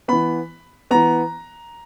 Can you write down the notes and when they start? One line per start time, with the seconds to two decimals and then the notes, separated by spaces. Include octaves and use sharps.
0.08 E3 B3 B5
0.91 E3 B3 A#5